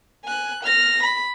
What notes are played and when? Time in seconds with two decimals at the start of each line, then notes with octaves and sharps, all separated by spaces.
0.25 G#5 F#6
0.64 F6 A#6
1.04 B5